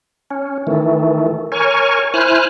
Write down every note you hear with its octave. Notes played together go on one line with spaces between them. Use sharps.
C#4
D#3 E3 A3
A#4 C#5 G#5 C#6
E4 C5 G#5 F6 F#6